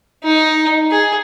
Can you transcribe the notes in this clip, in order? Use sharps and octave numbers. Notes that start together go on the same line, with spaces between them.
D#4
G#4